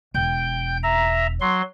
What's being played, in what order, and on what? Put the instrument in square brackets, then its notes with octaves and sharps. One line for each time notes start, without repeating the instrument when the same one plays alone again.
[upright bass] E1 [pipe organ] G5 G6
[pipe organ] E5 A#5
F#3 C6